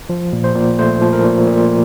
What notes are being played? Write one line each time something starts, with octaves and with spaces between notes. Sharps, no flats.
F3
A#2
C5
A#2
A3 C5
F3
A#4
A#2
A#2